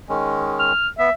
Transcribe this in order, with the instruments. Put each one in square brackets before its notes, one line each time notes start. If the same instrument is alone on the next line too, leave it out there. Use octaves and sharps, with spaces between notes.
[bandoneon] D#3 G#3 C#4
[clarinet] F6
[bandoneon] B3 [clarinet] E5